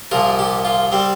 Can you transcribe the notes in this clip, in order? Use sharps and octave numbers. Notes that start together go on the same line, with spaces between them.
C2 A#2 F3 A#4
G4
F4
G3 C4